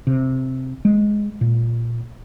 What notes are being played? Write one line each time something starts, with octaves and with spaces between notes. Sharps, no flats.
C3
G#3
A#2